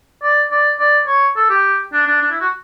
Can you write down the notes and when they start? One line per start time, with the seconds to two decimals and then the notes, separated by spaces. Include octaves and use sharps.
0.23 D5
0.51 D5
0.80 D5
1.07 C#5
1.36 A4
1.50 G4
1.93 D4
2.07 D4
2.21 D4
2.31 E4
2.41 F#4